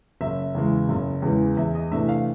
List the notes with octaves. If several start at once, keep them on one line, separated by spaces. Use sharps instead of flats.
F#1 E5
E2 C#3 E3 G#3
F#1
E2 C#3 E3 G#3
E2 E5
D#5
C3 E3 A3 D4 E5
F5